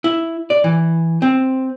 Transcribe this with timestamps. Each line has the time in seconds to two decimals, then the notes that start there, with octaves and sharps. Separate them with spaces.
0.04 E4
0.50 D5
0.64 E3
1.22 C4